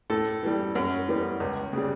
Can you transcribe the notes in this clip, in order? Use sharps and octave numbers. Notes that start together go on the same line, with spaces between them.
A2 A4
E3 G3
F#2
E3 G3 B3
C#2
C#3 G3